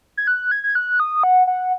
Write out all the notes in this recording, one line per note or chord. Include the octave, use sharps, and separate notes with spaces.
G#6
F#6
G#6
G#6
F#6
D#6
F#5
F#5